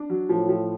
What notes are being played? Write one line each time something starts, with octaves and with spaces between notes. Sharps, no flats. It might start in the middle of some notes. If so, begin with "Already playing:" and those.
Already playing: D4
F#3
A2 F3
F3